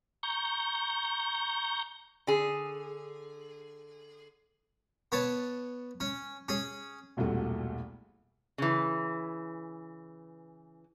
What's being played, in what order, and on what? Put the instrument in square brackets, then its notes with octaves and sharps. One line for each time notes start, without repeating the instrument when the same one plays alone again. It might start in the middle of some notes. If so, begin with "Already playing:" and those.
[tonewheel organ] A#5 C#6 G6
[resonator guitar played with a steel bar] D3 G#4
[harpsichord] B3 C#5 A5
C#4
C#4 G#4
[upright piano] E1 C2 A#2 G3 A3 F#4
[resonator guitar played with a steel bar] C#3 E3